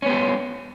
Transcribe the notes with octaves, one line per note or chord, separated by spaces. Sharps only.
G3 B3 C#4 G4